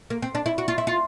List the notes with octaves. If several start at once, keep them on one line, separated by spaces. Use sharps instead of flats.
A#3
C4
D4
E4
F#4
F4
E4
F4